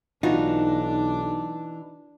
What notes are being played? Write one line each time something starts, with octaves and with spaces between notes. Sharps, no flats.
B1 E3 D4 D#4 F4 F#4 D5